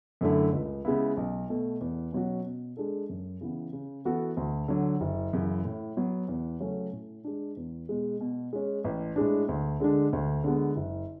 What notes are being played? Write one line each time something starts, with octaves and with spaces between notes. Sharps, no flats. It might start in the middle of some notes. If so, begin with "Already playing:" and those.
F#2 D3 A3 E4
C#2
C#3 G#3 B3 E4
B1
B2 A3
E2
B2 F#3 C#4 F#4
B2
G#3 D4 A4
F#2
C#3 E3 B3
C#3
E3 B3 F#4 A4
D2
D3 F#3
F#1
F#2 C#3 E3
A2
F#3 B3
E2
C#3 F#3 A3 C#4
A2
G#3 D4
E2
B2 G#3
B2
G#3 C#4
A1
A2 G#3 D4
D2
D3 G#3 D4
D2
D3 G#3 B3
F#1